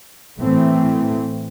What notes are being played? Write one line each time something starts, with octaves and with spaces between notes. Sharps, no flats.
A2 E3 A3 C4